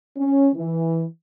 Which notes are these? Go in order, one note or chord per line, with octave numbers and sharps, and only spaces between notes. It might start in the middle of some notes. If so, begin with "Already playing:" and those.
C#4
E3